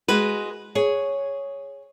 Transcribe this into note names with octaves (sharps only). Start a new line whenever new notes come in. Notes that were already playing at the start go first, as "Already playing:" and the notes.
G#3 F#4 B4
G#4 C#5